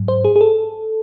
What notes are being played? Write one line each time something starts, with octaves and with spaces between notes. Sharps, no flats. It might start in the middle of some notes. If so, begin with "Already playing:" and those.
Already playing: G#2 F#3
C5
G#4
G#4
A4